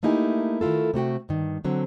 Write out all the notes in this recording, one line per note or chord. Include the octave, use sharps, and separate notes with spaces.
A3 A#3 D#4 E4 G4 G#5
D#3 A3 E4 F4 A4
C3 A3 F#4 G5
G2 D#3
D3 F#3 C4